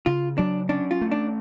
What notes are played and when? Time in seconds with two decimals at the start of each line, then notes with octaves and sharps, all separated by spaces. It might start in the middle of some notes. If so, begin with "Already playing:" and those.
0.06 C#3 F4
0.38 F#3 D4
0.69 C#4 D4
0.91 F4
1.01 A3
1.11 D4